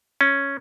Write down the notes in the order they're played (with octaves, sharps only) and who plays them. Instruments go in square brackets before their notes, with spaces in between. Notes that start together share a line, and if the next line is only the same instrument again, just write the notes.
[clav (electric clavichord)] C#4